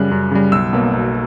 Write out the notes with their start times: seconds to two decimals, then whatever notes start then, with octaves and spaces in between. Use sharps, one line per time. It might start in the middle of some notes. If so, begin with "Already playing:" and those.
Already playing: F#2 C#3 G3 F#6
0.11 F#2
0.31 C#3 G3
0.52 B1 E6
0.73 B2 F#3 A#3
0.93 B1